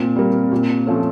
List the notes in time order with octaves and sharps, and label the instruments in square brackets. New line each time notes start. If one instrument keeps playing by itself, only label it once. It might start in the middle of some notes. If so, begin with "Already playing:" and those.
Already playing: [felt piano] A#2 [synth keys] C4
[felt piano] G3 A#3
A#2
F3 A3 C#4